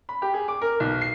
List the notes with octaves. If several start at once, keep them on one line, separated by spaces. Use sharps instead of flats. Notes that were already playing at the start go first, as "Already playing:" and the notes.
B5
G4
G#4
D6
A#4
B1
C7